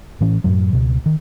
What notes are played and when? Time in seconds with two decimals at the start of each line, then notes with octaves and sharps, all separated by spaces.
0.21 A2 E3 C#4
0.44 F#2 A2 F#3
0.73 C#2 B2
1.06 D#3